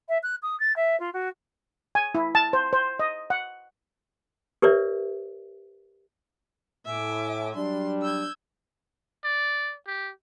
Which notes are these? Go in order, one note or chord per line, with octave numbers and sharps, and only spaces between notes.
E5
F#6
D#6
A6
E5
F4
F#4
G#5
E4
A5
C5
C5
D#5
F#5
G4 A#4 B4 C#5 D5 E5
A2 E5 G#5 D6
F#3 G3 D4 C6
E6 G6 G#6
D5
G4